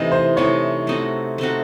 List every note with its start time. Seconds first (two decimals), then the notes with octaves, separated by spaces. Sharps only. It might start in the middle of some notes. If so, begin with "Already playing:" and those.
Already playing: C3 E3 A3 D#4 D#5
0.11 C5
0.37 C3 E3 A3 D#4 C#5
0.87 A3 C4 D#4 F#4
1.38 A3 C4 D#4 F#4